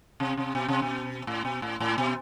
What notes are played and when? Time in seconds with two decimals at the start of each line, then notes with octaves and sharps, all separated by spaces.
0.20 C3
0.37 C3
0.55 B2
0.68 C3
0.82 B2
1.27 A2
1.45 B2
1.62 A2
1.80 A2
1.98 B2